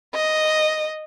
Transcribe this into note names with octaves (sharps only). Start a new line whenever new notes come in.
D#5